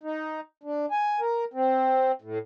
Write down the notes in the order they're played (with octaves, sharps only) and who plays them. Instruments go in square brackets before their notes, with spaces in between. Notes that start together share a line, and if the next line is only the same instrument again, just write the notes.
[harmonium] D#4
D4
G#5
A#4
C4
A2